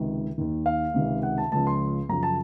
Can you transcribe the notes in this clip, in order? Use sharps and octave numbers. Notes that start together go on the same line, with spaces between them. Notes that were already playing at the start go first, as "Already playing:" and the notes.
Already playing: C#2 C3 D#3
D#2 D#3
F5
C#2 C3 D#3
F#5
A5
C#2 C#3 F3 A5
C6
F#2 C#3 F3 A#5
A5